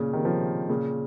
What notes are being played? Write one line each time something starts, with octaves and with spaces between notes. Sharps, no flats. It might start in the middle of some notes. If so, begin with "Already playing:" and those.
Already playing: A#2 C#3
C3 D#3
C#3 F3
A#2 C#3